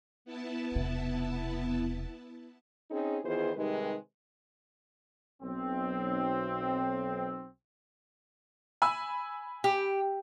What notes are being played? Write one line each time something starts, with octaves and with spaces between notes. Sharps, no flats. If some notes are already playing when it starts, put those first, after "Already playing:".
B3 E4 A5
E1 C3
C4 C#4 D#4 G#4
D#3 E3 B3 F4 G#4 C5
C3 D#3 G3 G#3 D#4 B4
B1 C4
G#5 B5 E6
G4